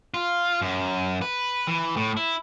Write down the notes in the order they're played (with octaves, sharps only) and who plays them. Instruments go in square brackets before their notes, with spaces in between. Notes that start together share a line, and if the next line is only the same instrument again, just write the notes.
[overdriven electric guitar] F4
F#2
B4
E3
A2
E4